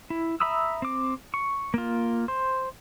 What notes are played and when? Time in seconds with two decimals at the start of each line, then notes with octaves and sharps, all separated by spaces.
0.10 E4
0.40 E5 A#5 B5 D#6 E6
0.82 C4 D6
1.34 C#6
1.74 A#3 F4
2.28 C5